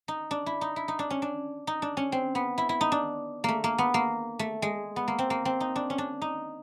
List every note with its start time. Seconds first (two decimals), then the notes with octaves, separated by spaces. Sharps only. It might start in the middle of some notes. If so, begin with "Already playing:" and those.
0.08 D#4
0.31 D4
0.46 E4
0.61 D#4
0.76 E4
0.88 D#4
0.99 D4
1.10 C#4
1.22 D4
1.67 D#4
1.82 D4
1.97 C#4
2.12 C4
2.35 B3
2.58 E4
2.69 E4
2.81 D#4
2.92 D4
3.44 A3 A#3
3.64 A#3
3.78 B3
3.94 A#3
4.39 A3
4.62 G#3
4.96 B3
5.08 A#3
5.19 C4
5.30 A#3
5.45 C4
5.60 D#4
5.76 D4
5.90 C#4
5.98 D4
6.22 D#4